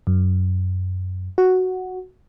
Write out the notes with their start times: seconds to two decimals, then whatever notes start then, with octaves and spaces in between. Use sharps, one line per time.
0.07 F#2
1.38 F#4